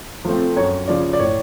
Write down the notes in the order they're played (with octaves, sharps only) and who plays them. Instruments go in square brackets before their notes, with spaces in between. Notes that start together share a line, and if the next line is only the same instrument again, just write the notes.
[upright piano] F3 A3 C4
F#2 C#5
C#3 F3 D5
D5
A2 C#5